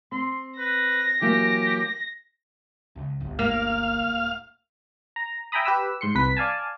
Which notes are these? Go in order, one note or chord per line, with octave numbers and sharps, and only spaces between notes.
C4 C6
B4 A#6
E3 F#3 A#3 G4
C#2
G1 D2
A#3 F5 F6
D#1
A#5
E5 G5 G#5 A#5 B5 D#6
G4 B4 E6
G#2 C6 C#7
C2 B4 B6
D5 F5 G#5 A5